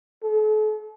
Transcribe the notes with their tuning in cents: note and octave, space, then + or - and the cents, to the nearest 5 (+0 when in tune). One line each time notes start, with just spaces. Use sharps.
A4 -40